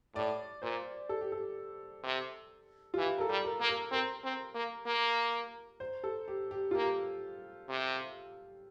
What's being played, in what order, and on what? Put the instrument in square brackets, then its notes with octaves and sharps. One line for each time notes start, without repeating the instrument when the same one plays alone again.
[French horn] A2 [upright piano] D5
[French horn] A#2 [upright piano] C5
[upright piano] A4
G4
A4
[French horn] C3
[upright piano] F4
[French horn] E3 [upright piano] G4
[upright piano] A#4
A4
[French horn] G3
[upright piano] A#4
[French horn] A#3
[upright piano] A#4
[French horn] C4 [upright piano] A#4
[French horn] C4
A#3
A#3
[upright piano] C5
A4
G4
G4
F4
[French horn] A#3 [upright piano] G4
[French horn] C3